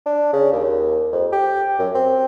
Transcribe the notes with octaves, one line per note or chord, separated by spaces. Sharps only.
D4
C#3
D#2
F2
G4
F#2
C4